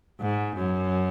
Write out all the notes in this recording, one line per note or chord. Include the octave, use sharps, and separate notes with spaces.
G#2
F#2